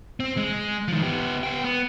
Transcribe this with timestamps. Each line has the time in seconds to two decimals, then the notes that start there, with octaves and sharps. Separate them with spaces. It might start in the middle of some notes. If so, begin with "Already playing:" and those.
0.20 C4
0.37 G#3
0.88 D#3 F3
1.02 B3 G4
1.43 B3 G5
1.64 B3